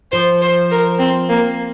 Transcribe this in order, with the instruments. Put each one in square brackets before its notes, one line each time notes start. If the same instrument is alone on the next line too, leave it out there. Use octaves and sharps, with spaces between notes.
[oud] F3 [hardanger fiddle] C5
[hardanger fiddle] C5
A#4
C4
A#3